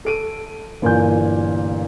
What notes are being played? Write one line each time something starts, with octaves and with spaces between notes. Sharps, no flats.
A4 D7 D#7
G1 A#2 E3 G#5 G6